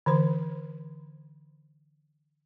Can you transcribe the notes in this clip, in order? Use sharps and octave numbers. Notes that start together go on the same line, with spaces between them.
D3 E3 C5